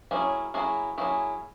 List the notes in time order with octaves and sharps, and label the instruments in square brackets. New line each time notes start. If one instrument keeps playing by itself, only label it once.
[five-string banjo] F#3 A#3 C#4 E4 G#4
F#3 A#3 C#4 E4 G#4
F#3 A#3 C#4 E4 G#4